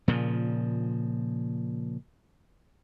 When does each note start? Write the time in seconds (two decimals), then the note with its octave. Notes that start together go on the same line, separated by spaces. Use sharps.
0.08 A#2 C#3 F3